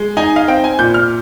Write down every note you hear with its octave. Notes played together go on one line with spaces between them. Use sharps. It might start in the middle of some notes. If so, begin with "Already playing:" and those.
Already playing: G#3
D#4 G#5
F5
C4 G5
G#5
A#2 G6
F6